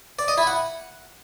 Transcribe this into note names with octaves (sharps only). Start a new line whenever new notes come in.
D5
D#5
E4
F#5